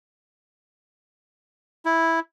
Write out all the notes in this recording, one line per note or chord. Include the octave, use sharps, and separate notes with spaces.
E4